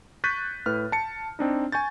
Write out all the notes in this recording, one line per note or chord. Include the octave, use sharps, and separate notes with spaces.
C#6 F#6 G6 A6 B6 D#7
A2 B4 F6
A5 C#7
C4 D4 D#4
G#5 C#6 G6 A6